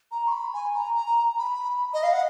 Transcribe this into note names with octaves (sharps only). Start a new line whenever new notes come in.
A#5
C#6
B5
G#5
A#5
A#5
B5
D#5
F5
F#5